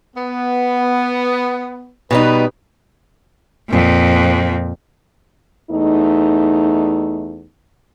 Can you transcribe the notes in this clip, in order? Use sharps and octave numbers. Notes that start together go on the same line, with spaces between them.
B3
B2 G3 D#4 B4
F2 A#2
E2 A3 D#4